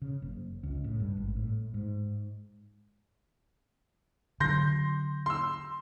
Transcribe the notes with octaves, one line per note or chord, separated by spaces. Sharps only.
C#3
F#1
C#2
A2
G2
G#1
A2
G#2
D3 F#3 C6 G6 A#6
C6 E6